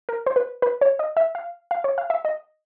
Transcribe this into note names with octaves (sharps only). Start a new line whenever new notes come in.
A#4
C5
B4
B4
C#5
D#5
E5
F5
F5
C#5
F5
E5
D#5